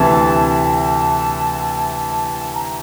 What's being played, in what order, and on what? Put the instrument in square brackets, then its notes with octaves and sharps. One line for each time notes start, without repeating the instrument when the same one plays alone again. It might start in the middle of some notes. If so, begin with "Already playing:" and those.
Already playing: [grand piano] D2 C3 E3 [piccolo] A5
[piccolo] A5
A#5